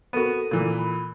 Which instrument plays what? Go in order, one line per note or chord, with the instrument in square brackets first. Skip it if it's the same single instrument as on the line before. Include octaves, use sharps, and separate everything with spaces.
[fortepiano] B3 F#4 [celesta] A4 A#4 D#7
[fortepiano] A#2 E3
[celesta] B5